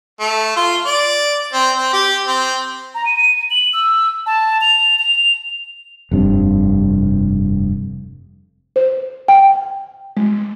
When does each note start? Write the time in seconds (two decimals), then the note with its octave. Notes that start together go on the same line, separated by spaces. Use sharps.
0.20 A3
0.56 F4
0.86 D5
1.53 C4
1.77 C4
1.93 G4
2.27 C4
2.95 A#5
3.06 D#7
3.50 F#7
3.73 E6
4.26 A5
4.61 F7
4.99 F7
6.11 F1 G2 C3
8.76 C5
9.28 G5
10.17 G#3